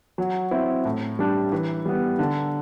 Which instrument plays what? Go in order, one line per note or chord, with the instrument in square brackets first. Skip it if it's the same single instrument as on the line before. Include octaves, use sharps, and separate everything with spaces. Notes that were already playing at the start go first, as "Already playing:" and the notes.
[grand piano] F#3
C4 E4
A2
G3 D4
E3
G3 B3
D3